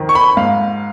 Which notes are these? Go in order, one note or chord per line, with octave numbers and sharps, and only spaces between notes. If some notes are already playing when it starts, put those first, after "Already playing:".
Already playing: F2 D#3
C#6
B5
G#2 F5